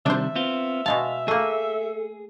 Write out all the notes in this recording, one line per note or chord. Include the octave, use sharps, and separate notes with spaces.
C3 D#3 G3 D4 C5 E5
B3 C4 F4
B2 G#3 F5 A5
A3 A#3 G#4 A4